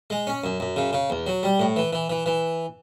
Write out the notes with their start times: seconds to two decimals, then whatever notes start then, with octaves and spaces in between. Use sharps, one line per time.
0.10 G#3
0.27 C#4
0.44 F#2
0.60 F#2
0.76 C#3
0.93 C#3
1.10 E2
1.27 F#3
1.43 G3
1.60 A2
1.76 E3
1.93 E3
2.10 E3
2.26 E3